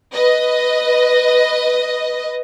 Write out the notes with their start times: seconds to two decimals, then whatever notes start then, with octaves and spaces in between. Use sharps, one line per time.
0.14 B4 D#5